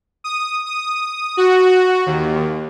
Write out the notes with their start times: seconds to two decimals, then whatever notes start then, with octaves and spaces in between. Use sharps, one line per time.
0.24 D#6
0.66 D#6
1.37 F#4
1.68 F#4
2.06 D#2